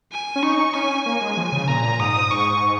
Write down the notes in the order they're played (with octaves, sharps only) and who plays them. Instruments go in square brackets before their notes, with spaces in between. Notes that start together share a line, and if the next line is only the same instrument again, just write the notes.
[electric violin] G#5
[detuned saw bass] C#4
[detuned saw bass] D#4 [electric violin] C#6
[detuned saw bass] C#4 [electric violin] G#5
[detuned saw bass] A#3 [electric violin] G#5
[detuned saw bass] G#3
F3
C#3
[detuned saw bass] A#2 [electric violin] A#5
[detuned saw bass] G#2 [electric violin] D#6
[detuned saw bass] G#2 [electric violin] C#6